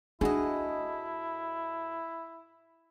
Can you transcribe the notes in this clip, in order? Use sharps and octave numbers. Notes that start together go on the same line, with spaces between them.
A2 D4 E4 F#4 G#4 D#5